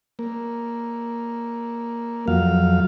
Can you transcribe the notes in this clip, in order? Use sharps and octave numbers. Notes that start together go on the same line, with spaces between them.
A#3
F2 F#3 F5